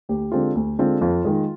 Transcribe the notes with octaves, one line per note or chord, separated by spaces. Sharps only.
D2 G4
D3 G#3 C4 F4
D2
D3 G#3 C4 F4
F2 F4
D#3 G#3